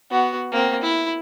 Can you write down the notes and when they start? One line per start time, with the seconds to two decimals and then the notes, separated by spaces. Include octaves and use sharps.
0.11 B3 F#4
0.52 A#3 C4
0.82 E4